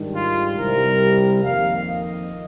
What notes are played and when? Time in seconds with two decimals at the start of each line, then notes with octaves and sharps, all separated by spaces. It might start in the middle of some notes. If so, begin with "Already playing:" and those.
Already playing: G#2 D#3 G3 D4
0.15 F4
0.58 C2 C3 G3 A#4
1.44 F2 D#3 A#3 F5
1.87 D#5